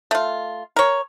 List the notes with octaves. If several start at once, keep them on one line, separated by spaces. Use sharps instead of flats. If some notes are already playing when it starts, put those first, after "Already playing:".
A3 F4
A#4 C#5